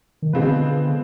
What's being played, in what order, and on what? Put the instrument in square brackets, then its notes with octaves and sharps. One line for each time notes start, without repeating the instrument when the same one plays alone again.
[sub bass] D#3
[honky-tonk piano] B2 G#3 C4 F4 B4 [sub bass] D3